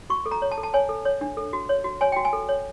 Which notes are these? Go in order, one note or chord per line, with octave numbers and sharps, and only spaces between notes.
F#4 C#6
A4
A#5
C#5
A5
A4
A5
C#5 G#5
A4
C#5
D4
A4
F#4
C#5
F#4
C#5 G#5
F#4 G5
G#5
A4
C#5